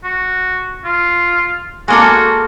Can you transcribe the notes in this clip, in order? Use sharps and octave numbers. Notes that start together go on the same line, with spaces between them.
F#4
F4
G#3 A#3 F#4 A4